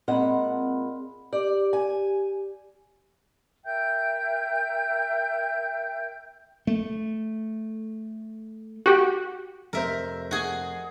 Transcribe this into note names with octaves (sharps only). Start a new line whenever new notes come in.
A#2 G#3 C4 F#5 B5
G4 D5
G#5
A#4 E5 G5 G6
A3
F#4 G4
F1 A#4 C5 E5
F#4 G#4